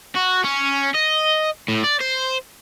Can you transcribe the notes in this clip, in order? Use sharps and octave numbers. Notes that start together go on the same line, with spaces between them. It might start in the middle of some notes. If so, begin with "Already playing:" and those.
F#4
C#4
D#5
A2
D5
C5